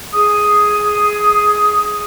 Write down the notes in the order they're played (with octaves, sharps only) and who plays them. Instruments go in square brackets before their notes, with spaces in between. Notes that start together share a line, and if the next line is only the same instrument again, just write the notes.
[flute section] G#4 D#6